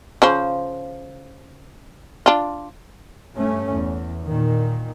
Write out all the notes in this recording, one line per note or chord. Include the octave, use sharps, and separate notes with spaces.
C#3 F3 C5
D4 F4
G2 A3 C#4
E2
A#2 D#3